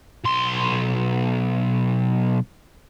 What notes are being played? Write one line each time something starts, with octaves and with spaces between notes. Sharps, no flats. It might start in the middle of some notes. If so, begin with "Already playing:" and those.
B1 C6